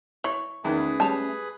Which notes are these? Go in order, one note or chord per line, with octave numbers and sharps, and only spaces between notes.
E3 C#5
E2 D#3 A3 C#4 G#4 B4
G3 C#5 A5